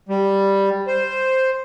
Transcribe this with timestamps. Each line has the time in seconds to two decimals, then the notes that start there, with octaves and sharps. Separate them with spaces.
0.09 G3
0.87 C5